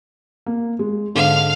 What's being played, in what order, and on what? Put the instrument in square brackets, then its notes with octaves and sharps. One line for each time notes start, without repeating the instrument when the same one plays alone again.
[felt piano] A#3
G#3
[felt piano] G#2 D3 [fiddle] F5